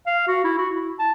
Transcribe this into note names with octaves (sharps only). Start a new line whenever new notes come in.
F5
F#4
E4
F#4
E4
A5